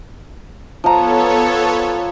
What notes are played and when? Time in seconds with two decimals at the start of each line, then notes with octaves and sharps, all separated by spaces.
0.84 F3 B3 A4 C#5 A#5